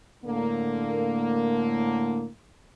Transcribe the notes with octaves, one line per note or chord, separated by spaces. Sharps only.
A2 D3 A#3